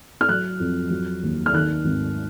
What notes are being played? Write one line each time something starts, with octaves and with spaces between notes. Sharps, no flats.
F6
F#3 F#6
F2
F#3
D#2
F6
D#3 F#6
G#1